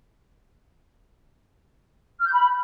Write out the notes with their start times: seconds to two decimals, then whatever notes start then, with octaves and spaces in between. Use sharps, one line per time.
2.20 F6
2.26 G6
2.31 B5